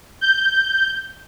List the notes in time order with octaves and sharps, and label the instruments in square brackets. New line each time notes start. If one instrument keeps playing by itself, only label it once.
[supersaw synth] G6